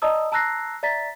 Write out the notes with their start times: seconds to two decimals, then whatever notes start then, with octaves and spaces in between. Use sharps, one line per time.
0.02 D5 D#5 A5 A#5 D#6 E6
0.32 A5 A#5 E6 F#6 A#6 C7
0.83 D5 E5 A#5 A6 B6